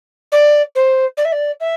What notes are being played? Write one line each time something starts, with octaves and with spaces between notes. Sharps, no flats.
D5
C5
D5
E5
D5
E5